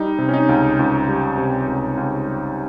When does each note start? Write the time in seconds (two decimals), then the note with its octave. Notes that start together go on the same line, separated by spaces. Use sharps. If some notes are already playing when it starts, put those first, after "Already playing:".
Already playing: G3 D#4
0.19 C3
0.29 C#4
0.34 D#4
0.49 C#2
0.79 C#2
1.09 G3
1.38 C3
1.68 C#2
1.97 C#2
2.27 G3